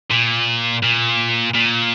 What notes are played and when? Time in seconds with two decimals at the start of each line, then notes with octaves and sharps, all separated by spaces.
0.10 A#2
0.83 A#2
1.55 A#2